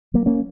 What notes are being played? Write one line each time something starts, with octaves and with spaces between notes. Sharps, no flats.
F#3 A#3
A#3 C#4